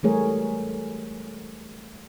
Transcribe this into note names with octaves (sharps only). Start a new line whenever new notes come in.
E3 G3 A3 G#4 A#4 C#5